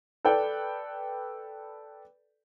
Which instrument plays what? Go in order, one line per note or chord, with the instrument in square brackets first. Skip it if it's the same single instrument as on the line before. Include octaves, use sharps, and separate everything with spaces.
[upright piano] A4 B4 D5 G5